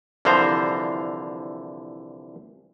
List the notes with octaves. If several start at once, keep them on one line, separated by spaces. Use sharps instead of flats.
C2 D3 E3 F3 C5 A#5